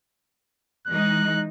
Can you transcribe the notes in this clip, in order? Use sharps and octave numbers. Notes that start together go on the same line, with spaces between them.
E3 G#3 D#4 F#6